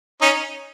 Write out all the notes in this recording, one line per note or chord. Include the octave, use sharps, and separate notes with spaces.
C#4 D#4